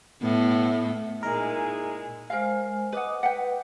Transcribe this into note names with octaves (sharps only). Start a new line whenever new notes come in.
A2 B3
A#2 G#3 D#4 E4 G#4 A#4
G#3 A#4 C5 F5 G#5
B4 D#5 F#5 D6 D#6
B4 F#5 G5